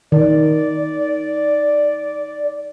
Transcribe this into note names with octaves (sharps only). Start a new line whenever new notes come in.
D#3 D5